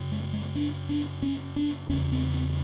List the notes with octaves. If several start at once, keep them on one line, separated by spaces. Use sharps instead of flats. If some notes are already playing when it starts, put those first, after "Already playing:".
Already playing: F#2 C#3
G#3
G#3
D4
D4
C#4
D4
E2 C#3 C#4
C4
C4